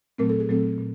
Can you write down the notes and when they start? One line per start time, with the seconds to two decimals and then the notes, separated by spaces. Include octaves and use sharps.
0.18 A#2 F#3 A3 C4 A#4
0.29 A4
0.40 G#4
0.49 A#2 F#3 A3 C4 A4
0.78 A#2